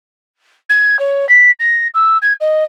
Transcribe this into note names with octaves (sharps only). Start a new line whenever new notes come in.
G#6
C#5
B6
A#6
E6
G#6
D#5